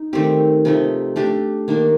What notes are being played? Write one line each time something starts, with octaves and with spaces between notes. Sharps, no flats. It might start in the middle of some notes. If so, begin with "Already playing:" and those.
Already playing: D#4
D#3 A3 C4 G4
C3 F3 A3 D#4
A3 D4 G4
D#3 A#3 D4